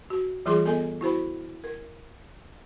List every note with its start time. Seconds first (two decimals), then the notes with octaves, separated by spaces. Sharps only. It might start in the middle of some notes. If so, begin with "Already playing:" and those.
0.10 F#4
0.46 E3 G3 F4 G#4 C6 D6
0.66 B3 A4 D#5 G#5
1.01 E4 F#4 C5 B5
1.64 A#4